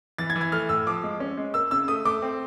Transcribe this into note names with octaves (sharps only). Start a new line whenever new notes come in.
E3 A6
G#6
E3
G#6
A3 F6
A2 E6
F3 D6
G#3
C#4
G#3
A#3 E6
C#3 E6
A3 D#6
A3 D6
C4